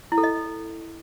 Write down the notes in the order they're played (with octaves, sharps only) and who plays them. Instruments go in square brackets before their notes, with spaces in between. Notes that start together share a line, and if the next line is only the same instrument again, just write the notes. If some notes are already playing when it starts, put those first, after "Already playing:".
[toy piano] E4
A4
D#5